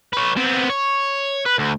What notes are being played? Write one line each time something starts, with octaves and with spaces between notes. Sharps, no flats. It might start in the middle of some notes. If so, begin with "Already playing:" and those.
B4 C#5
B3 C4
C#5
B4
D2